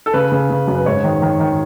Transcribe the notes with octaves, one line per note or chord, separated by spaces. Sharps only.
A4
C#3 B4
C#3
C#3
F#2
B4
G#2 C#5
D#3
D#3
D#3